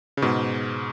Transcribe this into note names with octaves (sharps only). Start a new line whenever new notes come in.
C#3
G#2 B2